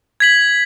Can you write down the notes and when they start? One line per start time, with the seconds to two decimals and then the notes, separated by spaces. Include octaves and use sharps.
0.20 G#6 B6 F#7